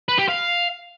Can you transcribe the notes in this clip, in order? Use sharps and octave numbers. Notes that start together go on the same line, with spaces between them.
B4
G4
F5